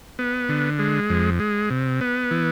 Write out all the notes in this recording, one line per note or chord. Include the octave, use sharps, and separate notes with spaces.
B3
D3
G#3
F2
G#3
C3
B3
E3